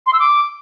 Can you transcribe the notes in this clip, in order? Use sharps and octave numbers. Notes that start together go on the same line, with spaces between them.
C6
E6
D6